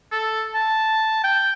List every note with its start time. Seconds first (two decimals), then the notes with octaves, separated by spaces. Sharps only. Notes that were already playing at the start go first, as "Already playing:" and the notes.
0.12 A4
0.54 A5
1.24 G5